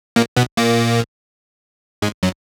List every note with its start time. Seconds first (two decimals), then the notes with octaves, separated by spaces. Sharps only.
0.16 A#2 A#3
0.36 B2 B3
0.57 A#2 A#3
2.02 G#2 G#3
2.23 F#2 F#3